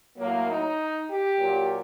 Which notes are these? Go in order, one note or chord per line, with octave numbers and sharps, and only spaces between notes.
A2 F#3 A#3
D#4
G4
A#2 F#3